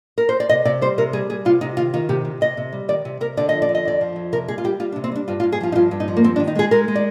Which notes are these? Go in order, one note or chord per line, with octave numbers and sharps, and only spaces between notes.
A#4
C5
D5
C3 D#5
C3 D5
G3 C5
C3 A#4
G3 G#4
G3 G#4
C3 F4
C3 D#4
D#3 F4
D#3 F4
C3 G4
C3
C3 D#5
C3
G3
D#3 D5
C3
C3 A#4
D3 D5
F3 D#5
D5
D3
D#5
F2 D5
F3
F2
C3 A#4
G3 G#4
F4
G3 G4
G3 F4
D4
C3
C4
G3 D4
G2 F4
F4
G2
G#4
F3 F4
D#4
G2 F4
G2
D#4
F3
A#3
G2 C4
D4
D#3
D#4
G#3 G#4
G#3 A#4
G#3
D5